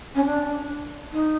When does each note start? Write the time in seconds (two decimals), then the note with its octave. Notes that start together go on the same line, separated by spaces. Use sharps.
0.15 C#4
0.25 D4
1.12 D#4